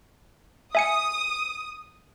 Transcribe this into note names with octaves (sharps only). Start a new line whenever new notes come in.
E5 G#5 D#6 C#7